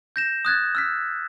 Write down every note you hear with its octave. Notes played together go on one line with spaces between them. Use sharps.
G6 A#6 E7
D#6 F#6 G#6 A6
E6 F6 B6